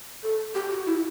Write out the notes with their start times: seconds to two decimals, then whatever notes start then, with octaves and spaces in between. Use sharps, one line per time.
0.23 A4
0.55 G4
0.71 F#4
0.86 E4